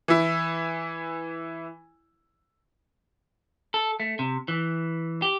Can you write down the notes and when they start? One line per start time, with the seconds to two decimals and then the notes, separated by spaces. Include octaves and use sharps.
0.08 E3 E4
3.74 A4
4.00 A3
4.19 C3
4.48 E3
5.22 G4